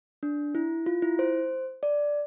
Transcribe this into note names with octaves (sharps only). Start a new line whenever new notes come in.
D4
E4
F4
E4
C5
D5